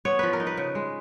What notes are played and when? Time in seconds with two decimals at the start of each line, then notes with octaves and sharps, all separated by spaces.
0.05 B3 C#5
0.19 F3 B4
0.33 A#4
0.40 D#4
0.47 B4
0.57 C#3
0.75 G#3